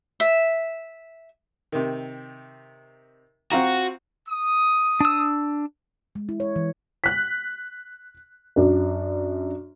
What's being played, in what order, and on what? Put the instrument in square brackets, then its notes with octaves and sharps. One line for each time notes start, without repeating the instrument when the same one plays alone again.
[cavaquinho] E5
[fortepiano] C3 D#3
[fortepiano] C4 F4 A#5 [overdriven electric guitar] F#4
[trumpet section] D#6
[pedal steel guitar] D4 E6
[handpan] G#3
E4
C#5
E3
[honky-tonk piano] F#6 B6
F#2 D4